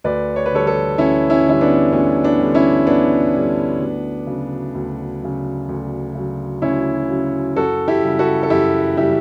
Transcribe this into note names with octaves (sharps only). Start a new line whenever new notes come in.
D2 B4 D5
C#5
B4
D3 G3 A4 C#5
A4 C#5
D2 C#4 E4
C#4 E4
D3 G3 E4
B3 D4
D2 C#4
B3 D4
D3 G3
C#4 E4
D2 B3 D4
D3 G3
D2
C#3 F#3
D2
C#3 F#3
D2
C#3 F#3
D2 C#4 E4
C#3 F#3
F#2 F#4 A4
E4 G4
C#3 G3
F#4 A4
A4
F#2 E4 G4
C#3 G3 E4 G4